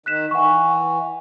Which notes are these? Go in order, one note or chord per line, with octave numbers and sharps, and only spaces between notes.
D#3 F#6 B6 E7
E3 F#5 C#6